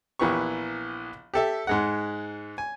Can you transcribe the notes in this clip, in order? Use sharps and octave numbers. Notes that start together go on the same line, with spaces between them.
A#1 E3 B3 G4 C#6
G4 A4 E5
G#2 G#3 F#5
G#5